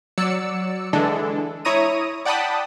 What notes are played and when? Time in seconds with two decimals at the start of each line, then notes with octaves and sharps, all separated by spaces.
0.18 F#3 D5 E6 C#7
0.93 D3 E3 G#3 D4 A4
1.65 E4 C#5 A#5 D#6 D#7
2.25 D5 F#5 G5 A5 B5 D#6